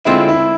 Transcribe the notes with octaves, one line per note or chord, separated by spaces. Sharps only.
D3 G#3 C4 E4 F4
E4